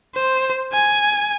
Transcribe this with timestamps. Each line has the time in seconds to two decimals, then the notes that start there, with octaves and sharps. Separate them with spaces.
0.15 C5
0.73 G#5